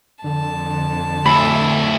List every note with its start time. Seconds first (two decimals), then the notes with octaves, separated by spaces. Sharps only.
0.24 F2 D3 A5
1.26 D2 E4 B5